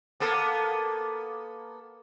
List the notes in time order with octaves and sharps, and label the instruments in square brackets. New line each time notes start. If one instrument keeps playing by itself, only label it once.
[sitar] A#3 B3 A4